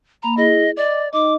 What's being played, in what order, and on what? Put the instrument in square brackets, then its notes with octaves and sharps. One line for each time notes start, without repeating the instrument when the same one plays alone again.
[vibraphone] A#3 B5 [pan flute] A#5
[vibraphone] E4 G#4 [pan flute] D#5
[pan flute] D5 [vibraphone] D#5 D6
[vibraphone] D#4 D#5 [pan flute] D6